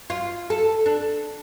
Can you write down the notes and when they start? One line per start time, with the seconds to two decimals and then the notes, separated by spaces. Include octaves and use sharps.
0.10 F4
0.50 A4
0.86 D4